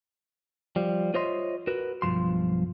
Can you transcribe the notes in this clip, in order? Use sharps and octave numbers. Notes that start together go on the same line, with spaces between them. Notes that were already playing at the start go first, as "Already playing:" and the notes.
F3 G3
F4 C5 C#5 D#5 E5 C6
F#4 A#4 B4
B1 G2 F3 C6